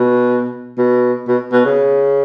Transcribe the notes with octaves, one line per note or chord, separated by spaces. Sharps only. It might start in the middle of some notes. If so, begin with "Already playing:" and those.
Already playing: B2
B2
B2
B2
C#3